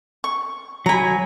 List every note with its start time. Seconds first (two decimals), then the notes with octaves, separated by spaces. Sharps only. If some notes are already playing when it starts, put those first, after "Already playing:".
0.24 C#6
0.86 F#3 G#5 A#5 B5